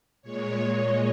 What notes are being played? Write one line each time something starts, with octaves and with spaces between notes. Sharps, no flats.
A#2 G#3 C#5
D#5